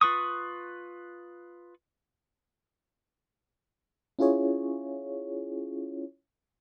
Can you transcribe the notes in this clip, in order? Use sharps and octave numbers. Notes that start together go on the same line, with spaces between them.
F4 B4 C#6 D#6
C#4 E4 F4 G#4 C#5